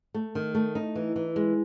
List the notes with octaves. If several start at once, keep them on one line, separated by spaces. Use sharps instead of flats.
A3
D#3
A3
D#4
E3
E3
G#3